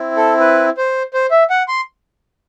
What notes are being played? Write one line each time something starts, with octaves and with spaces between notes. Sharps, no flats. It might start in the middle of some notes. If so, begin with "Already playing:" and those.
Already playing: C4 E4
A4
B4
C5
C5
E5
F#5
C6